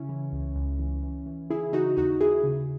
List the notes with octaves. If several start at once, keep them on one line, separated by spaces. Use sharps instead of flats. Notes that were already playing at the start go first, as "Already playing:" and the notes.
Already playing: C#3 C#4 E4
E3
C#2
C#2
E3
E3
E3
C#3 E4 G#4
E3 D#4 F#4
D#2 D#4 F#4
D#2 E4 G#4
C#3